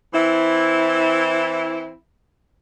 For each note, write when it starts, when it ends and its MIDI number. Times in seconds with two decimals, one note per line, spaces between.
0.14 1.92 52
0.14 1.92 60
0.14 1.92 64